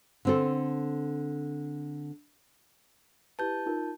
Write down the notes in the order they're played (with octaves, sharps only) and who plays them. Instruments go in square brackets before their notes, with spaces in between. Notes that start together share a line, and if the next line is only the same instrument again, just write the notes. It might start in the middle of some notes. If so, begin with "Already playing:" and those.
[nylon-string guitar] D3 C4 A4
[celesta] E4 G4 B4 [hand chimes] A5 G6
[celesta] D#4 F4 A#4